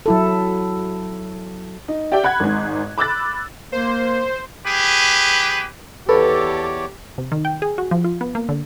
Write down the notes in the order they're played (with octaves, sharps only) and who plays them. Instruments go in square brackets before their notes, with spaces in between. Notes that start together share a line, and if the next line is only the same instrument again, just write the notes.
[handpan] F#3 E4 A4
[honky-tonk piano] D#4
G4 D5 E5 G5
F#5 B5 F#6 G#6
G#1 G#2
B5 D6 E6 F#6 A6
[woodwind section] A#3 [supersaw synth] C5
[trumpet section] G4 G#4 B4
[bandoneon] E2 C#5 D5 [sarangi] G4 [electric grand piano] A4 [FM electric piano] B4
[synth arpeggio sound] C3
D#3
G5
G#4
F#4
F3
F4
B3
A#3
D3